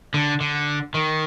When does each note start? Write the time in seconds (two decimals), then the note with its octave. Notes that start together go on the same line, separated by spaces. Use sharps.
0.14 D3
0.40 D3
0.94 D#3